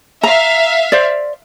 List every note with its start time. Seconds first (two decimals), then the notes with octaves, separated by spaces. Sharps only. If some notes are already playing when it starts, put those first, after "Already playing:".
0.23 E5 F5 A#5
0.92 C5 D5